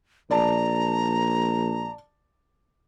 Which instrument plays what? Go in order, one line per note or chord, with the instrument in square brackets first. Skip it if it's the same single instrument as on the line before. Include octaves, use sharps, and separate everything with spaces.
[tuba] A#1 [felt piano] D5 A5 [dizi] A#5